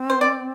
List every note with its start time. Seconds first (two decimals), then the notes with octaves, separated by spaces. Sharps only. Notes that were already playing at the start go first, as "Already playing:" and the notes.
Already playing: C4
0.10 C5
0.21 D5